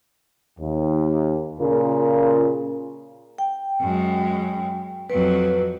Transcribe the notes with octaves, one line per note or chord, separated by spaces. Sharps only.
D#2
A#2 C#3 F4 A#4
G5
F#2 G#3
F2 F#3 B4